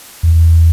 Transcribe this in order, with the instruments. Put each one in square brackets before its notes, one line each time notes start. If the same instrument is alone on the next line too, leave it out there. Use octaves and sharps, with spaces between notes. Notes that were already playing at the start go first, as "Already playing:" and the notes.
[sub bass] E2